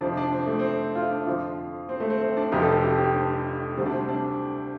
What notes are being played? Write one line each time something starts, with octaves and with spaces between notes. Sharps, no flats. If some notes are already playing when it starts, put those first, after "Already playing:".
F2 C3 F3 D4
D4
C4
A3
C4
F4
D4
F2 D3 F3 F4
C4
A3
C4
C4
D4
F1 F2 C3 F3 G4
A4
A4
G4
G4
D4
D2 C3 G3 C4
D4
C4
D4